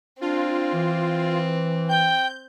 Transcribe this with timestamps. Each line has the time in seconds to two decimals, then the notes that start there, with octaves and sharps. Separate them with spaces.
0.21 C4 D4 F4
0.73 E3
1.89 G5 G6